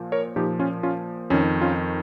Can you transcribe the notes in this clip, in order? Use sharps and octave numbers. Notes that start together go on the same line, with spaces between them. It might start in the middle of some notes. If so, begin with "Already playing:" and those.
Already playing: A#2 F3
A#4 C#5
A#2 F3 D#4 G4
C#4 F4
C#4 F4
F2 D#3 C#4
C#4 F4